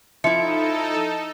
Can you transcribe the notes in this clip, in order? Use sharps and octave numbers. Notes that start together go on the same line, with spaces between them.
F3 D#4 E4 A4 E5 C#7